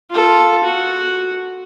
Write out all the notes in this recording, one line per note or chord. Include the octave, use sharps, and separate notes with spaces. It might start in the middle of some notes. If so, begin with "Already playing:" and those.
F4 A4
F#4